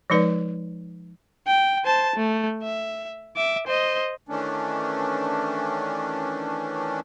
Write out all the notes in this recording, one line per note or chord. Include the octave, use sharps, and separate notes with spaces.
F3 G#3 D#4 B4 D5
G5
C5 A5
A3
E5
E5 D6
C5 D#5
D#3 E3 A3 C#4 D4